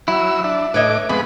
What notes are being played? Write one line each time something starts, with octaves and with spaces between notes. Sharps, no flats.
F#3 E4 E6
D4 E5
A2 B4 C#5 D#5 D6
F2 G#3 B3 B5